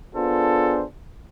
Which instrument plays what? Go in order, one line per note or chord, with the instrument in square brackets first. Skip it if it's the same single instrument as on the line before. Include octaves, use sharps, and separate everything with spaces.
[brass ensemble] B3 D4 F4 G#4 A4 C5